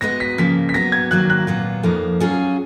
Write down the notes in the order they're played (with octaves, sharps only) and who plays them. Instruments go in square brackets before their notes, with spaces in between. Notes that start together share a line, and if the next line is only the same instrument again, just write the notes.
[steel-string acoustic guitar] G#3 B3 F#4 B4 D#5 [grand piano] A#6
[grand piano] B6
[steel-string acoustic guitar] C#3 F3 A#3 [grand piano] B6
[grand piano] B6
[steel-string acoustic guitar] F#3 B3 F#4 [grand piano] A#6
[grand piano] G#6
[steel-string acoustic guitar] D#3 F#3 A#3 F4 [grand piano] F#6
[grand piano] F#6
[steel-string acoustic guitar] A#2 F#3 B3 F4
F2 F3 A#3 D#4
F#3 C#4 F4 G#4